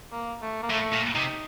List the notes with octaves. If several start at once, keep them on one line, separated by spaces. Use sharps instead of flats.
A#3
A3
A#3
A2 A3
A#2
C3 D#4